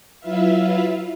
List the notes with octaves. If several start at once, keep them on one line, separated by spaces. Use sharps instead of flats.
F#3 E4 F4 B4 E5 F5